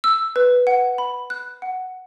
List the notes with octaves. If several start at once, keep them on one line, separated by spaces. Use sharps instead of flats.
E6
B4
F#5
B5
F#6
F#5